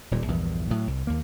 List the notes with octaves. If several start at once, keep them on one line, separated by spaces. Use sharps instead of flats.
D#1 A#2 G3
A#1 E2 G2 E3
A2 F#3
C2
D#2 A#3